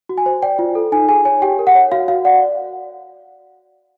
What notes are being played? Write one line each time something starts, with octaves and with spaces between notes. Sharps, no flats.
F#4
G#5
C5
D5 G5
F4
A4
D#4 G#5
G#4 G#5
C#5 G#5
G4 G5
A#4
F#5
C#5
F#4 F5
F#4 F5
D5 F#5
D5